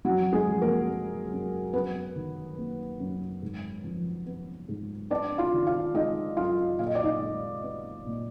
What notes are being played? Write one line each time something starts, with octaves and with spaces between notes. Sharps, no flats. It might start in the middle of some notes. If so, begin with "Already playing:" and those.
F#2 F#3 F#4
G#3 G#4
F3
A#3 A#4
A#3
F#2
F#2 B3 B4
D#3
A#3
F#2
G#2
F3
B3
G#2
B3 D4 D5
F4 F5
D#3
F4 F5
G#3 D#4 D#5
F#2 F4 F5
A#2 F5
D#5
D5
D#4 D#5
G#3
B3
A#2